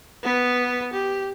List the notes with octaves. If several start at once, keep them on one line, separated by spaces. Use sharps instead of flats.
B3 B4
G4